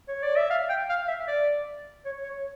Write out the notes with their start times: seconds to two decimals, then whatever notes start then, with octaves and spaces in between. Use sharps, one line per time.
0.08 C#5
0.23 D5
0.36 E5
0.50 F5
0.69 G5
0.89 F5
1.08 E5
1.28 D5
2.05 C#5
2.24 C#5